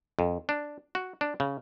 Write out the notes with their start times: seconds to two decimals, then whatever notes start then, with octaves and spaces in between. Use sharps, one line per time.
0.19 F2
0.49 D4
0.95 F#4
1.21 D4
1.40 C#3